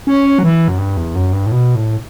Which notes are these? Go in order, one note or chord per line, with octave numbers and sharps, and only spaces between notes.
C#4
F#3
E3
F#2
G2
E2
F#2
G2
A2
B2
A2